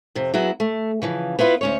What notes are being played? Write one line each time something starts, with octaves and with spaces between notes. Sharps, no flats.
F2 C3
F#3 B3 E4 F#4 G#4
A3
C#3 E3 F3
B3 E4 F4 A#4 B4
D2 C#4 C#5